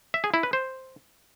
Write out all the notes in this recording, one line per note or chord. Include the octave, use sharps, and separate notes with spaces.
E5
G#4
E4
B4
C5